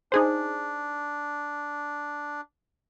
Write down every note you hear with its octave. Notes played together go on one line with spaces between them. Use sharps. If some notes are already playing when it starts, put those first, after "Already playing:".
D4 D#4 G#4 C5